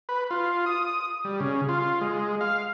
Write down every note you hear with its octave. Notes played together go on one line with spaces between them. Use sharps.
B4
F4
D#6
G3
C#3
F4
G#3
F5